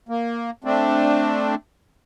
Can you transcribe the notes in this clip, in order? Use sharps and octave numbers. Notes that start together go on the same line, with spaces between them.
A#3
A3 C4 D4